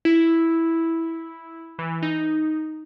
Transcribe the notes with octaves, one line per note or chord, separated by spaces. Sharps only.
E4
E3
D#4